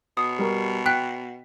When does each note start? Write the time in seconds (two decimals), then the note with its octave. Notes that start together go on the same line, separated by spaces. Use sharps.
0.17 B2 D#6
0.39 G3 A#4 C#6
0.86 G5 F#6 B6